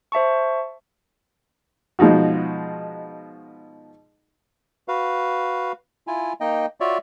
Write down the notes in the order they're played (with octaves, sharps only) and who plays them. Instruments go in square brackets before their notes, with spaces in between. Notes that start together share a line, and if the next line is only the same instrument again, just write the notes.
[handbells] C5 E5 A5 C#6
[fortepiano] B2 F3 G#3 D#4 F#4
[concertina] F#4 B4 F5
E4 F4 G#5
A#3 D#4 D#5 G5
F4 F#4 C#5 D5 E5